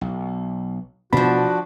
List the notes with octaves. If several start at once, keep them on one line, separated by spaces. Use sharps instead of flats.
B1
A1 B2 F3 B3 D4 F#4 B5